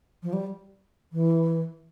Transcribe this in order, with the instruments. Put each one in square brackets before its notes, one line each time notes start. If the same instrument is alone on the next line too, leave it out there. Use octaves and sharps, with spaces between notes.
[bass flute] F3
G3
E3